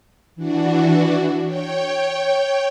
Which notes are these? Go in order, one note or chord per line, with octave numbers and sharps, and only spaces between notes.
E3 D4 F#4
C#5 G5